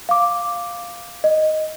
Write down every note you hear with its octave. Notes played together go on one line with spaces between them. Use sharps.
F5 D6
D#5